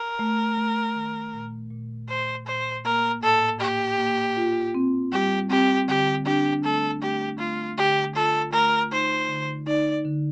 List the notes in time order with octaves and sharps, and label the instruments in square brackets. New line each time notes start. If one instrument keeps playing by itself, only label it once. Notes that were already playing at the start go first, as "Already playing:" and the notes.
Already playing: [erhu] A#4
[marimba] A3
A3
D#3
A#2
A#2
[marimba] A#2 [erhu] C5
[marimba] A#2 [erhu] C5
[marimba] A#3 [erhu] A#4
[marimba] A2 [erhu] A4
[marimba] A#3 [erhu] G4
[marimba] A#3
F4
C4
[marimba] G3 [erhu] G4
[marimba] C4 [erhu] G4
[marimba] D3 [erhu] G4
[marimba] D4 [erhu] G4
[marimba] A3 [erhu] A4
[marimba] A3 [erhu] G4
[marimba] A3 [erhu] F4
[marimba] D3 [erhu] G4
[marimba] F4 [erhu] A4
[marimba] A3 [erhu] A#4
[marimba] D#4 [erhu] C5
[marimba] D3
[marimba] D#4 [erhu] D5
[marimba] D3